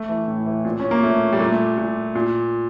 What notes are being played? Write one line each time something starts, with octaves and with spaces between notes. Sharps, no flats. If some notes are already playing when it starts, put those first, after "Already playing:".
Already playing: A3
E3
A2
E3
A#2
C#4
A#3
A#2 A3
G3
A#2 A3
A#2
A#2